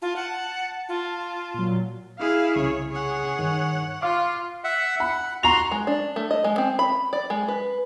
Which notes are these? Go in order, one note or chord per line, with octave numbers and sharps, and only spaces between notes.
F4 A5
F#5
F4
A#2 F#3
E4 G#4 F5
C2 C#3 C#5
G#4 C#5 F#5
G2 D#3
F4 F5 D6
E5 F#5
F#5 B5
F#4 A#5 C6 F7
G#3
D4
A3
D#5
G#3
C4
B5
D5
G#3
B4